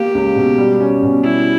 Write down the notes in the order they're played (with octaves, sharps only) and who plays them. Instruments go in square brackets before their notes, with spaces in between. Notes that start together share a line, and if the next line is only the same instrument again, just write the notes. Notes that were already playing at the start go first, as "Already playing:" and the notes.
Already playing: [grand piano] A#3 [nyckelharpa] G4
[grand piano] C#2
B2
G3
C#4
B2
[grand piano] G3 [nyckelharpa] E4